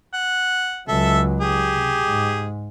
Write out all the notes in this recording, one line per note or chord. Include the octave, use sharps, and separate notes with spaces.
F#5
C#2 F#3 A4 E5
G4 G#4
C3
G#2